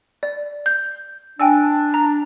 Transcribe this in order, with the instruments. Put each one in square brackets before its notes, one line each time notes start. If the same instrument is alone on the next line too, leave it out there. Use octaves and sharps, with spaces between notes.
[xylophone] D5
G6
[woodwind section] D4 [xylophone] G5 G#5 E6
[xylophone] A#5